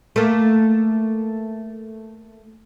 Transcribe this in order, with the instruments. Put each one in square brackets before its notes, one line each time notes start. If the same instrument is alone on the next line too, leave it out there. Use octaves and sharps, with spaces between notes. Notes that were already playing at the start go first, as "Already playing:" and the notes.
[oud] A3 A#3